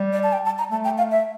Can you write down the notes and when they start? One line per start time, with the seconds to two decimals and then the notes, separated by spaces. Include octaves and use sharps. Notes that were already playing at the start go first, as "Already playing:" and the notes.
Already playing: G3
0.13 D5
0.23 A5
0.33 G5
0.46 A5
0.58 A#5
0.71 A3 A5
0.84 G5
0.98 F5
1.11 E5